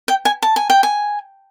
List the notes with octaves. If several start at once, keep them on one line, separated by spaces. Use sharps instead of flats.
G5
G#5
A5
G#5
G5
G#5